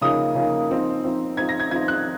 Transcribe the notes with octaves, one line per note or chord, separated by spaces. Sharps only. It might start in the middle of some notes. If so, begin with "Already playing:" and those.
C#3 F3 A#3 D#4 D#6
C#3 F3 A#3 D#4
F3 C4 D#4
F3 C4 D#4
F3 C4 D#4 G#6
A#6
G#6
F3 C4 D#4 G#6
F#6